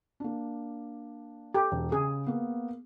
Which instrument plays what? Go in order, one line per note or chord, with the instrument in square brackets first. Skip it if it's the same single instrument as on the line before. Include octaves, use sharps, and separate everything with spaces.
[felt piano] A#3 D4
[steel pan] G4 [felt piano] A4
[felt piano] E1
[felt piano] C#3 [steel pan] G#4
[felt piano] A#3 B3